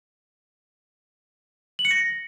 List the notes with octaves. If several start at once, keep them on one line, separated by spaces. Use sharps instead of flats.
F#7
C#7
A#6